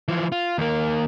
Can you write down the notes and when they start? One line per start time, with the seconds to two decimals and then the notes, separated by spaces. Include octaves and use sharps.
0.08 E3 F3
0.32 F4
0.58 D#2 A#3